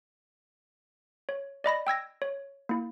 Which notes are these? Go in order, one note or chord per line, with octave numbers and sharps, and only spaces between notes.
C#5
D5 D#5 B5 A#6
G5 E6 G#6 A#6
C#5
A#3 E4